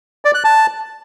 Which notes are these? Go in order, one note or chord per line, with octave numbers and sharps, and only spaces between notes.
D5
F#6
A5